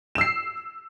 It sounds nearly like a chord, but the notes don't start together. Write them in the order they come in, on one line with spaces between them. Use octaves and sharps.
E7 E6 C7